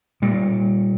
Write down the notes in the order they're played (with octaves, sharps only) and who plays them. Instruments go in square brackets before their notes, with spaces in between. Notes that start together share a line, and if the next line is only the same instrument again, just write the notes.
[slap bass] A#2 G3